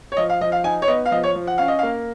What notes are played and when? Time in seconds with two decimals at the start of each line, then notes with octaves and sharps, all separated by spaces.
0.12 C#5
0.17 F3 D#5
0.30 F5
0.41 F3 D#5
0.52 F5
0.64 D#4 G#5
0.82 C#5
0.87 B3 D#5
1.05 F5
1.11 F3 D#5
1.23 C#5
1.35 F3
1.47 F#5
1.58 C#4 F5
1.68 D#5
1.79 F5
1.83 A#3